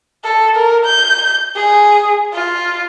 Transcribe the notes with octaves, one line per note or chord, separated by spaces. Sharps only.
A4
A#4
G6
G#4
F4